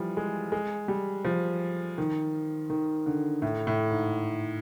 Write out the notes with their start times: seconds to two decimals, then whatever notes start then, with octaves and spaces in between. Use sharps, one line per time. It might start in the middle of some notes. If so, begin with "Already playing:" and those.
Already playing: E3 F3 G3
0.17 G#3
0.52 G#3
0.88 G3
1.25 F3
1.98 D#3
2.70 D#3
3.06 D3
3.42 A2
3.67 A2
3.90 G#2